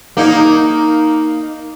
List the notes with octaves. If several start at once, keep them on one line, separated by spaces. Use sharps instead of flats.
A#3 D#4